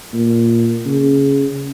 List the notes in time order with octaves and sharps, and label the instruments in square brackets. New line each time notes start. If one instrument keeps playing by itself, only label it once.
[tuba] A#2
C#3